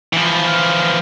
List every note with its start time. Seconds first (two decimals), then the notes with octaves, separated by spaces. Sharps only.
0.13 E3 F3